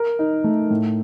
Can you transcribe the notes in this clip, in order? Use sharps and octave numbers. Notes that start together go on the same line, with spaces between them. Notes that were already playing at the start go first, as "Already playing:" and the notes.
Already playing: A#4
D#4
A3
A2